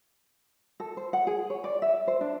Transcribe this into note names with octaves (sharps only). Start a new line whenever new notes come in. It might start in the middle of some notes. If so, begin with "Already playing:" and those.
A4
C5
F#5
G#4
C#5
D5
E5
C5
D4